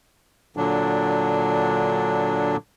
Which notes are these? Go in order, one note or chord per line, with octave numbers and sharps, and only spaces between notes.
A#2 D3 F#3 D4